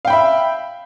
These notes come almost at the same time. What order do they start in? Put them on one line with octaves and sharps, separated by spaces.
F5 G5 B5 E5